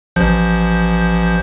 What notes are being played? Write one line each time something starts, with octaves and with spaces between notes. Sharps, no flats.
A1 F3 G6